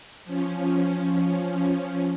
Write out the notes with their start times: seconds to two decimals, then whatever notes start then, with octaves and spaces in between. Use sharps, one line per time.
0.25 F3 C#4